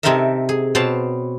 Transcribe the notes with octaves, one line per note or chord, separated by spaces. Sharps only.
C3 C4 D#4 A4 A#4 E5
G#4
B2 C4 C5 C#5 A5